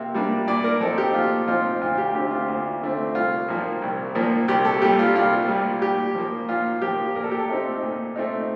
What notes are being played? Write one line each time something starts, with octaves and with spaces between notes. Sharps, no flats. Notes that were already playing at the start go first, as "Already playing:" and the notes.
Already playing: C3 A#3
G3 A#3 D4
A#2 D5
A#4
F3 C4 D#4 A4
G4
A#2 F4
F3 C4 D#4 F4
D2 F4
G4
D3 A3 C4 G4
F4
D2 F4
D3 A3 C4
C2 F4
A#2 F3 A#3
C2
A#2 F3 A#3
C2 G4
A4
A#2 G3 G4
F4
C2 F4
A#2 G3
A#2 G4
F3 A#3
A#2 F4
F3 A#3 G4
A#2 A#4
A4
G4
A4
A3 C4 D#4
A#2
A3 C4 D#4